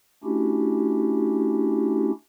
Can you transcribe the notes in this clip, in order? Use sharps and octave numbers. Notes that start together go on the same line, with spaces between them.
A3 C#4 D4 E4 F#4 G4